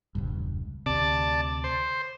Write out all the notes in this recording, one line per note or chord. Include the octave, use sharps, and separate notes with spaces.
E1 C#2 G2
D2 C3 D5 A5
C5